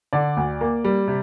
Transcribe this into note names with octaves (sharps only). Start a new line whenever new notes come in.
D3 D5
D2
A#3
G3
C3